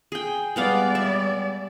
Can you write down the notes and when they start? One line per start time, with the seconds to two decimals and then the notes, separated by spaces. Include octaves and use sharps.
0.12 G#4 G5
0.56 G3 G#3 B3 D5 F5
0.95 E5